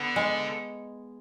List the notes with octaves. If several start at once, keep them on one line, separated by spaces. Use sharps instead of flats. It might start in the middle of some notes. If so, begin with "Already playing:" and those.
Already playing: D3 B3
G#3